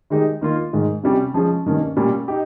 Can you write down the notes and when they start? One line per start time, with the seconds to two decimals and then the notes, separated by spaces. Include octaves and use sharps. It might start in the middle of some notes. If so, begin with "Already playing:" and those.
0.10 D#3 G#3 D#4 G4
0.41 D#3 A#3 F4
0.73 G#2 D#3 G#3
1.04 C3 G3 C#4 G4
1.34 F3 G#3 C#4 G#4
1.66 G2 D#3 A#3 C#4
1.97 A#2 G3 A#3 C#4
2.28 D#4 G4